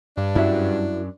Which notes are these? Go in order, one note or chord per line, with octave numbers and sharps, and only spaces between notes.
G2 D4
F#2 C#4 E4 F#4 E5